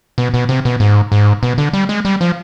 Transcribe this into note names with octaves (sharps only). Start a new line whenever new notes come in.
B2
B2
C3
B2
G#2
G#2
B2
D3
G3
G#3
G3
F3